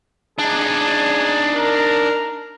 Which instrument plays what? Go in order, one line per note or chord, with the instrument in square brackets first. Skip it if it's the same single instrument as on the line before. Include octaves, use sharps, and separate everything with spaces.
[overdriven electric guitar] D4 D#4 [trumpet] G#4
[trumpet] A#4